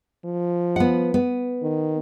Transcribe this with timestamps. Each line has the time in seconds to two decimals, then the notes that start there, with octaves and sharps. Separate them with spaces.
0.25 F3
0.76 B3 F#5
1.14 B3
1.62 D#3